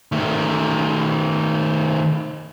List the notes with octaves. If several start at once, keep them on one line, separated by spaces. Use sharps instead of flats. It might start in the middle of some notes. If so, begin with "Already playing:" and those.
D#3 A3